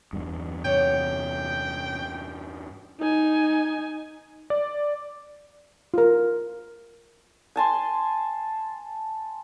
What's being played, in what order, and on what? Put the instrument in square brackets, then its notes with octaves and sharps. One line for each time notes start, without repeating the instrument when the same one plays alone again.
[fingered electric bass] E2 G2
[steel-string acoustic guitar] C3 C#5 F#5 [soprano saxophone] G5
[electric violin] D#4 G#5
[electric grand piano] D5
[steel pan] F4 A#4
[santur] G#5 A5 C6